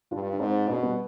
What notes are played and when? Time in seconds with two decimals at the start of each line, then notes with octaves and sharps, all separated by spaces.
0.11 G2 D4 F4
0.33 D4
0.40 G#2 C4 D#4
0.68 B2 B3 D4
0.83 G3 B3